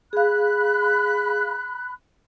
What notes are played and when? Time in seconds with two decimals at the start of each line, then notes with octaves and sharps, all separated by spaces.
0.13 G#4 F5 B5 F#6